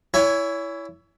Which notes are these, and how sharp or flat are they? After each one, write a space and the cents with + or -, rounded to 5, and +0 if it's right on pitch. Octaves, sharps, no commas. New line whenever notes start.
E4 +10 C#5 +30 G#5 +0